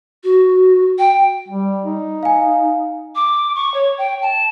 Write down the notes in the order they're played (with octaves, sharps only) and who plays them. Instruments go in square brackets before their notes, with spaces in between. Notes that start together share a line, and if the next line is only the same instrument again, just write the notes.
[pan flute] F#4
G5
[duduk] G3
D#4
[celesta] F5 G#5
[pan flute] D6
C#6
C#5
G5
A5